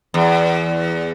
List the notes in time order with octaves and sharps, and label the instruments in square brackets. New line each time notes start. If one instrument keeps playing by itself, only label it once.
[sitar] E2